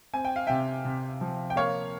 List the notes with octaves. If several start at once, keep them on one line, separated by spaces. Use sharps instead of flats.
C4 G#5
G5
F5
C3 E5 G5
C3
F3
G5
A#3 C#5 F5